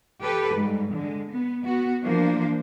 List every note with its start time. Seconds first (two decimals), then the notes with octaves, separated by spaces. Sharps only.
0.23 G4 A4 B4
0.55 G#2 G3
0.92 D3 G#3
1.29 B3
1.65 B3 F#4
2.03 E3 F3 A#3 D4 C5